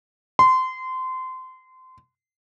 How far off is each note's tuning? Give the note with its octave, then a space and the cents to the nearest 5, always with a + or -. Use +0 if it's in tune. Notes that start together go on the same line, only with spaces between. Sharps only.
C6 -25